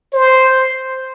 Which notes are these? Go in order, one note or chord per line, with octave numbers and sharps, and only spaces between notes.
C5